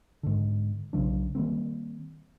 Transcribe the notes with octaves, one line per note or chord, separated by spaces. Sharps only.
G#2 D3
B1 C#3 F#3 D4
D#3 G3 A#3 C4